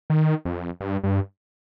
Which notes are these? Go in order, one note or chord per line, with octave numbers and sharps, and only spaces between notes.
D#3
F2
G2
G2